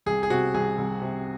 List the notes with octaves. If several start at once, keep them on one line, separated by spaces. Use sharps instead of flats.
C2 G#4
G#4
C3 F#4
C2 G#4
C2
C3